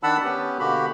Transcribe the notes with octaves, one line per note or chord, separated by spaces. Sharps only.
D#3 D4 F#5 A5 B5 E6
B3 C#4 G4 B4
B2 D3 A#3 F#4 G4 B5